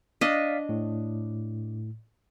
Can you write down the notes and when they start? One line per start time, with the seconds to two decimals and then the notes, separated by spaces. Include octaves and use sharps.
0.21 D4 D5 D#5 F5 B6
0.69 A2